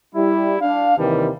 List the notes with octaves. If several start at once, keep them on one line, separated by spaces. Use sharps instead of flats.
G3 E4
D4 F5
D#2 C3 D#3 E3 G3